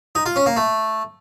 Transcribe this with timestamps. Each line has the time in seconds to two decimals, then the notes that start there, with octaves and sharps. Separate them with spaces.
0.15 D#4
0.26 F4
0.36 C#4
0.46 A#3
0.57 A3